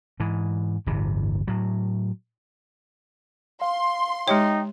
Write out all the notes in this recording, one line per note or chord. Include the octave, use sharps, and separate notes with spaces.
G#2 E3
D1 G1 C3 E3
A2 F#3
F5 C6
G#3 D#4 G4 C#5 G5